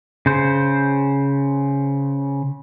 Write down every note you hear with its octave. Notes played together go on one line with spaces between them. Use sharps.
C#3 C5